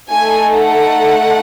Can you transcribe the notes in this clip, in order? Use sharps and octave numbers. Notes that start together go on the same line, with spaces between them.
A3 D#4 A4 G#5
F#5